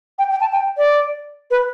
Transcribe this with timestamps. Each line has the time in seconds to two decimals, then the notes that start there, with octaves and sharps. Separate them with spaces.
0.19 G5
0.31 G5
0.41 A5
0.52 G5
0.78 D5
1.51 B4